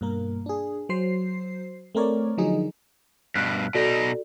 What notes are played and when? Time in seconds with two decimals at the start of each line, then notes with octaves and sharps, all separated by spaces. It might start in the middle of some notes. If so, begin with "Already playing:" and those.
0.01 G2 B2 A#3 A#4
0.46 D4 G#4
0.89 F#3 C5 C7
1.95 A3 C4 A#4 C#5 D5
2.37 D3 F3 F#3 D#4 G#4
3.35 G2 B2 F6 F#6 B6
3.75 B2 D#4 F#4 A4 D5